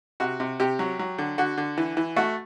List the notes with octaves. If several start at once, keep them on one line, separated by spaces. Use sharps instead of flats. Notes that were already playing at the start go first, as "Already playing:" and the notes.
C3 F#4
C3
C3 G4
F#3
F#3
D3
D3 F#4
D3
E3
E3
A3 F#4